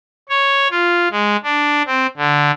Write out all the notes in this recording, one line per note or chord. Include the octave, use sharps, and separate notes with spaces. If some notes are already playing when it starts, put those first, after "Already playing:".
C#5
F4
G#3
D4
C4
D3